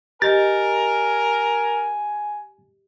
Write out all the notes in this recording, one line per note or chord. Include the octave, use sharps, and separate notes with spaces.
G4 A#4 D#5 G#5 A6